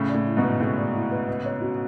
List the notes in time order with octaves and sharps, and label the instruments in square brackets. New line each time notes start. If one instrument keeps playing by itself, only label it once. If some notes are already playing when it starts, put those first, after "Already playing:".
Already playing: [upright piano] A2 C#3 [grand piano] A3
[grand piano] D5
[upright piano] A2
[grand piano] E4
[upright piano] G#2 B2
[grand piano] B4
[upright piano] A2 C#3 [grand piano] A3
[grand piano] D5
E4
B4
B3
C#5
F#4